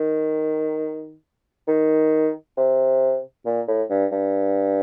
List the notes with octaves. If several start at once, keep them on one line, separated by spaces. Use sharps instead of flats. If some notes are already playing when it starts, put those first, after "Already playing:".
Already playing: D#3
D#3
C3
A#2
A2
G2
G2